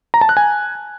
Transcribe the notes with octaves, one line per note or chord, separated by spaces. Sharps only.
A#5
A5
F#6
G#5